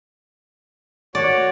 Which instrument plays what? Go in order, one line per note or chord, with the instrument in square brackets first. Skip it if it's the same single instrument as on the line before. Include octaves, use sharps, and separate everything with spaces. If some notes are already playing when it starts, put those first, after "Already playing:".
[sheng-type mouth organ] F#4 C#5 [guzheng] D5